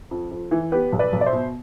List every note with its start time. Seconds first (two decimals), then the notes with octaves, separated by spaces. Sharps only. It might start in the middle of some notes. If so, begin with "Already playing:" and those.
0.11 F2
0.31 F2
0.51 E3
0.72 B3 G4 B4
0.92 B1
0.99 B4 D5
1.13 B1
1.21 D5
1.26 C5 E5
1.33 B2